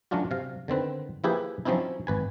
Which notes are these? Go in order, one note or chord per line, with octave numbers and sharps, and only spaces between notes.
F#3 A3 C#4 D4 F4 F#4
C3 F5
D3 D#3 C4 B4
F3 A#3 E4 G4 G#4 B4
F3 F#3 C4 C#4 D#4 E4
G#1 B4 G#5